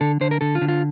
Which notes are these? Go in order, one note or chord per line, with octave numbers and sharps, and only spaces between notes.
D3 A4
D3 C5
A#4
D3 A4
F4
D3
F4